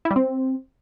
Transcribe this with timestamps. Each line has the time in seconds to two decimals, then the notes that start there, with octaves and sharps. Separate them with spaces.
0.05 E4
0.11 G3
0.16 C4